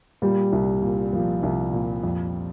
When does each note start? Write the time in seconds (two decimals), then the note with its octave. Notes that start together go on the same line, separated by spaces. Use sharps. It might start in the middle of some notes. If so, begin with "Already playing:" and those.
0.22 A#2 G3
0.53 C2
0.82 A#2
1.13 A#2 F3
1.43 C2
1.73 A#2
2.03 F2